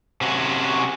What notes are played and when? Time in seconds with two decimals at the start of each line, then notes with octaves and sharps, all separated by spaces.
0.21 C3 C#4 F#4